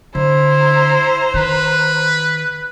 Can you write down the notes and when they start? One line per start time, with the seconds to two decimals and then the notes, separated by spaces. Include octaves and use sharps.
0.15 D3 E4 C5 A#5
1.34 D#3 B4